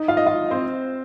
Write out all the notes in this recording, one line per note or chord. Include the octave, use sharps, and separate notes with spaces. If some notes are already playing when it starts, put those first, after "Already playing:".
Already playing: D#4 D#5
F4 F5
D#5
F4 F5
C4 C5